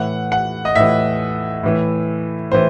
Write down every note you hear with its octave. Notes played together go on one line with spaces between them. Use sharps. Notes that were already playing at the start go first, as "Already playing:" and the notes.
Already playing: A2 E3 F#5
F#5
D#5
A2 E3 E5
A2 E3
A2 E3 C5